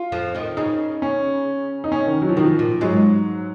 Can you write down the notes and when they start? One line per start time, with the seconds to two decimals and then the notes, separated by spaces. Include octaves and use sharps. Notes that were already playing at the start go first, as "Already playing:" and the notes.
Already playing: F4
0.12 F2 F3
0.35 D#2 D#3
0.57 C#3 D#4
1.02 C#4
1.84 D#4
1.92 C#4
2.07 D#3
2.22 F#3
2.29 F3
2.36 B2 D#3
2.44 F3
2.59 A#2
2.81 G#2 F#3 G#3